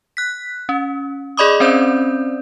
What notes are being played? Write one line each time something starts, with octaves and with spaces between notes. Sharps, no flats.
F#6 B6
C#4
G#4 D5 D#5 B5 D6 D#6
C4 C#4 C5 D5 G6